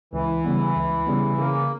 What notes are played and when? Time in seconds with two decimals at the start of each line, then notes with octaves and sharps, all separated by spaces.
0.13 C#2 E3
0.45 C#3 G3 B3
0.76 C#2
1.07 C#3 G3 B3
1.38 C#3 A#3